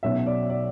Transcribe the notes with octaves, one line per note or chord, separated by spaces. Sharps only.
B1 B2 F#3 C#4 E5
D5
D5